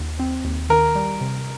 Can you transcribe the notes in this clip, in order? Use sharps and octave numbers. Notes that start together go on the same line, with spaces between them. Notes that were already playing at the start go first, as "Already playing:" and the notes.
Already playing: D#2
C4
D#2
D#3 A#4
G3
C3